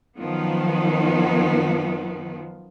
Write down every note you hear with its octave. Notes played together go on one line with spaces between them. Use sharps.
F#2 D#3 F3 B3